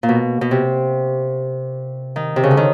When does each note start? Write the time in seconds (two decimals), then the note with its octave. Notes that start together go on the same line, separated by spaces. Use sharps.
0.03 A#2
0.09 B2
0.41 B2
0.51 C3
2.16 D#3
2.36 C3
2.43 C#3
2.51 D3
2.57 D#3